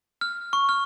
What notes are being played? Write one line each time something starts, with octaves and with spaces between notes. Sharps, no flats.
F6
C#6
F6